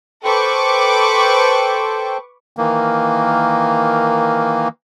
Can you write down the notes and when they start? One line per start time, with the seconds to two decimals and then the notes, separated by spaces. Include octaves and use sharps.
0.24 A4 B4 C5 G5 C#6 D6
2.56 D#3 E3 A#3